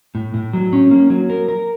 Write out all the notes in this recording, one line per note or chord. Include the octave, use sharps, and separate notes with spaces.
A2
A2
F#3
C#4
A#3
F#3
A#4
A#4